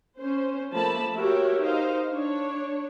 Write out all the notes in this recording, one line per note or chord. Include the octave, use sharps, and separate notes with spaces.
C#4 C5
F3 A3 A#3 A5 B5
F#4 G4 A#4 C#5 E5
D#4 A#4 C5 F5
D4 C#5